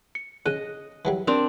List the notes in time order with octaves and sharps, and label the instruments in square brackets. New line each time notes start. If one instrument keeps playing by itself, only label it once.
[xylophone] C#7
[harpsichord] C#3 [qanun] D#5 [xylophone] F#6
[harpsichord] E3 F#3 G3
[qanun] C4 D4 D5 [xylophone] A#4 C6